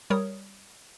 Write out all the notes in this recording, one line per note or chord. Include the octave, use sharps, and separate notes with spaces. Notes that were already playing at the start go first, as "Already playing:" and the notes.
G3 A#4 C#5 D#6